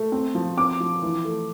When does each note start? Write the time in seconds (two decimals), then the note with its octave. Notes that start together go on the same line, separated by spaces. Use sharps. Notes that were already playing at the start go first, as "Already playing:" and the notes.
Already playing: A3
0.12 C4
0.35 F3
0.57 C4 D6
0.80 F3
1.02 E3
1.24 A3